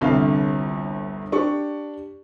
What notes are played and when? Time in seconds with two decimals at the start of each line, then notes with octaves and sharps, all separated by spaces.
0.01 G1 C2 D3 F5
1.32 D4 G4 C#6